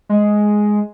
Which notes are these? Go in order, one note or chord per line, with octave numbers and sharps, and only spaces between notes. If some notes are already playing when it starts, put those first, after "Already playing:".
G#3